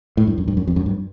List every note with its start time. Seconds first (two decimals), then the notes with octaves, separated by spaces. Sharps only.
0.17 A2
0.27 G2
0.38 F#2
0.48 G2
0.57 F#2
0.67 F2
0.76 F#2
0.86 G2